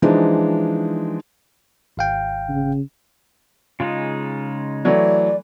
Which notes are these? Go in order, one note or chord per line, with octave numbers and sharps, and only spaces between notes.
E3 F3 G#3 D4 D#4
G#1 F5 G5
C#3
C#3 G#3 D#4 F4
E3 F#3 A3 D5